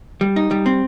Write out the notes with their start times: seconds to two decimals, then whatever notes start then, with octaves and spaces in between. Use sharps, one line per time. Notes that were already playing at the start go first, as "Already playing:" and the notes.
0.21 G3
0.36 D#4
0.51 G3
0.66 C4